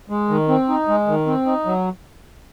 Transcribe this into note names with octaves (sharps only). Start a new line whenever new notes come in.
G#3
D#3
C4
D#4
G#3
D#3
C4
D#4
F#3